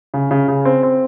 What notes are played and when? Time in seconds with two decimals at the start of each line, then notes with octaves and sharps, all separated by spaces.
0.14 C#3
0.31 C#3
0.48 C#3
0.65 C4
0.83 C4